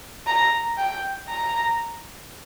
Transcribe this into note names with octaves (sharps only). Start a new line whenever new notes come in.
A#5
G5
A#5